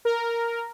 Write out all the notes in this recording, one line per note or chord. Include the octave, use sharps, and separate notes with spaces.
A#4